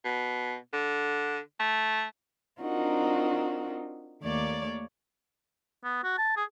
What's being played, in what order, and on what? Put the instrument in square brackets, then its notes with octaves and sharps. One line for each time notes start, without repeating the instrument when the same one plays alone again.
[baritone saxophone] B2
D3
A3
[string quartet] C4 D4 D#4 F4 F#4 A#4
D#2 A3 A#3 C#5 D5 D6
[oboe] B3
F#4
A5
G#4